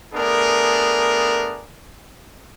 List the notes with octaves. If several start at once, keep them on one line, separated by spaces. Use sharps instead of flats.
A3 B3 D4 G#4 A#4